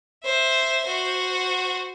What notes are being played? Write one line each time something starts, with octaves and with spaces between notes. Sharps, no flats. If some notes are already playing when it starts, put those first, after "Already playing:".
C5 E5
F#4 C5